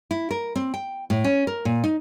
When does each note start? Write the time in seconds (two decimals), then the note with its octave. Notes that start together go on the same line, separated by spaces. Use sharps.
0.11 E4
0.31 A#4
0.56 C4
0.74 G5
1.10 A2
1.24 C#4
1.47 A#4
1.65 A#2
1.84 D#4